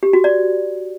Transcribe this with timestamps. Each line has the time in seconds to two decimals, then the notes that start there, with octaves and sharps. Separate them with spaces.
0.03 G4
0.13 F#4
0.24 D5